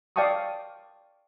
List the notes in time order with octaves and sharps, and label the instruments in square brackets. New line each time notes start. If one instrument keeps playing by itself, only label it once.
[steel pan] D5 F5 G5 A5 C#6 D#6